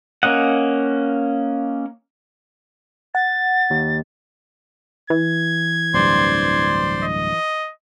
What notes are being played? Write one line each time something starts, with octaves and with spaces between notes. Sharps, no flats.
A#3 C#4 D#5 F#5
F#5 A6
D#2
E3 G#6
D1 G2 C5 D5 C6
D#5